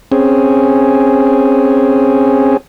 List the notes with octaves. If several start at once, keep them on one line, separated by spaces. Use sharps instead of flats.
C4 C#4 G#4